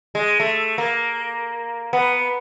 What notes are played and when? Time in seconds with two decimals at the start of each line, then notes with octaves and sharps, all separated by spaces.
0.15 G#3
0.40 A3
0.78 A#3
1.93 B3